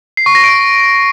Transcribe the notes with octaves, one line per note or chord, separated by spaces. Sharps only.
C7
C#6
A#6
D7